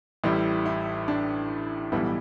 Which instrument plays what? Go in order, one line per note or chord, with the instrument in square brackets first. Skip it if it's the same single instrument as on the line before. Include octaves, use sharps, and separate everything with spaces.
[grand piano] A1 A2 G3 E4
E4
D4
B1 A2 E3 G3 B3 E4